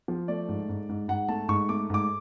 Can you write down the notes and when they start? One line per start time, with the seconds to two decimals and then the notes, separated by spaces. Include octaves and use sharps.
0.08 F3
0.28 A3 D5
0.49 G#2
0.69 G#2
0.89 G#2
1.08 G#2 F#5
1.28 A3 A5
1.48 G#2 C#6
1.69 A3 D6
1.90 G#2 D6